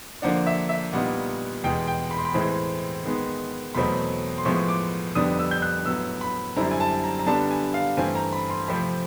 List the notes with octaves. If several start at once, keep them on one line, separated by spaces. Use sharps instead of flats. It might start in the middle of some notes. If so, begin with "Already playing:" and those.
D3 F3 A#3 D4 F#5
E5
E5
A#2 G3 B3 D#4 F#5
E2 B2 G#3 G5
G5
B5
C6
B5
A2 E3 G#3 C4
D#3 G#3 B3
E2 B2 F#3 A3 C4 B5
C6
A2 F3 G#3 B3 C#6
D6
F2 D3 G3 B3 D4 D#6
E6
G6
F#6
A2 F#3 B3 E6
B5
F#2 D3 G3 C4 E4 A#5
G#5
A5
A#5
A#5
D3 G3 B3 D4 A5
G#5
F5
G2 E3 A3 C4 G#5
A#5
B5
C6
C3 F3 A3 C4 B5